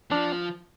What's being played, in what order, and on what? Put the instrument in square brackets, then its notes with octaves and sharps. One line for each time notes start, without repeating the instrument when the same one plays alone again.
[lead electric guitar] F3 [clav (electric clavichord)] D4